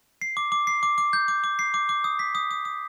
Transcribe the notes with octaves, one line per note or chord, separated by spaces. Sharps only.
C7
D6
D6
C7
D6
D6
G6
D6
D6
C7
D6
D6
D#6
B6
D#6
D#6
D#6